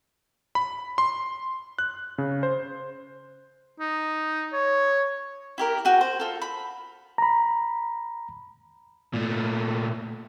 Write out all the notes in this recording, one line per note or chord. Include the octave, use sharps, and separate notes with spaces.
B5
C6
F#6
C#3
C5
D#4
C#5
E4 G4 A#4
F#4 G#4 G5
C5
F4 A4
B5
A#5 B5
A#2 A3